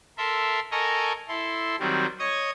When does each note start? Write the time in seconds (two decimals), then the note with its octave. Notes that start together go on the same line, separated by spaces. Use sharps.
0.18 A4 A#4 E5 C6
0.71 A4 A#4 D#5 G#5 A#5 C#6
1.28 E4 A4 C6
1.80 D#3 F#3 G3 C4
2.19 C#5 D#5 C#6 D#6 G#6